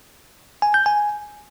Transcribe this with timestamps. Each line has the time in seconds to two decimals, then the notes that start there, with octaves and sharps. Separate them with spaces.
0.62 G#5
0.74 G6
0.86 G#5